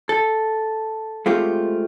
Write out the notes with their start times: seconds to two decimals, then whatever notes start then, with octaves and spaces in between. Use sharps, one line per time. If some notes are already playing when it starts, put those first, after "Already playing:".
0.09 A4
1.26 G#3 A3 C4 F4 G4